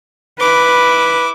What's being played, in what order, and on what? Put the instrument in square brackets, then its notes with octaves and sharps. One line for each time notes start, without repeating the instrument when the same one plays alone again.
[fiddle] E4 D6 [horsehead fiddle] B4